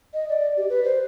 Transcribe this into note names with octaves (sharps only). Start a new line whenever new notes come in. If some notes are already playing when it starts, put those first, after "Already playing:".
D#5
D5
G4
B4
C5